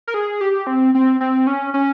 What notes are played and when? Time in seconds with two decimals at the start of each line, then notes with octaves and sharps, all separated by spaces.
0.07 A#4
0.14 G#4
0.41 G4
0.67 C4
0.95 C4
1.21 C4
1.47 C#4
1.74 C#4